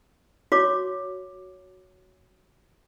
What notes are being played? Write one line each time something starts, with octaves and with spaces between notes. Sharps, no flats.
F#4 C#5 D6